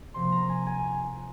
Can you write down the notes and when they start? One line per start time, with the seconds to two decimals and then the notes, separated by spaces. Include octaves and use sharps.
0.14 C3 F3 A#3 C6
0.32 A#5
0.49 G#5
0.66 G#5